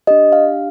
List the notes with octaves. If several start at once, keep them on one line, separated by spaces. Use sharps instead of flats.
D4 G4 D#5
F5